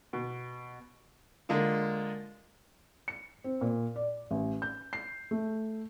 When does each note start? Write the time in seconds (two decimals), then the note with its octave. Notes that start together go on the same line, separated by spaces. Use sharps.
0.13 B2
1.49 D3 G#3 A#3 F4
3.08 C#7
3.44 C4
3.61 A#2
3.96 D5
4.31 A1
4.62 G6
4.93 C7
5.31 A3